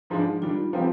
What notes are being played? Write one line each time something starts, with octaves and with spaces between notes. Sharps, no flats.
G#2 F3 G#3 D4
D#3 G3 D4 F4
F3 G#3 C4 G4